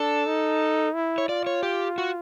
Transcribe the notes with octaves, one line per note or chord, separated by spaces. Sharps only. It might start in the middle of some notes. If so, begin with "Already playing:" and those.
Already playing: D4 A4
D#4
E4
C#5
F4 D5
C#5
G4
F#4